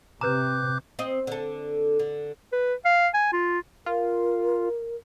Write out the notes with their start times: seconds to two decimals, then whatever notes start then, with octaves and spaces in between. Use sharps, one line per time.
0.21 C3 B4 A#5 D6 F#6 G6
0.99 C4 D#5
1.27 D3 A4
1.99 D3
2.53 B4
2.85 F5
3.14 G#5
3.33 F4
3.86 F4 A#4